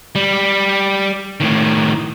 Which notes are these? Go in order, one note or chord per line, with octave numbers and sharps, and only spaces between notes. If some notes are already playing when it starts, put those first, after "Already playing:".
G3
A2 D#3